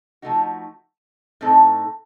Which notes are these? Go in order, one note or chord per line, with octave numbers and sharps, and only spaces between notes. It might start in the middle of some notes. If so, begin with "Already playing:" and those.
F3 A3 D#4 F#4
A2 A3 C4 D#4 A4